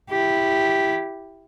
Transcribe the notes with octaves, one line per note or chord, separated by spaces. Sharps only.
E4 G4